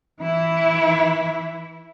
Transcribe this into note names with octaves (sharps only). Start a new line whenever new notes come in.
E3 E4